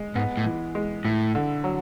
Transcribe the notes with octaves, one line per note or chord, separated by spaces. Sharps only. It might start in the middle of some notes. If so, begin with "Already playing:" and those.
Already playing: G#3
G#2 B3
A2
E3
G#3
A2 E4
D3
F#3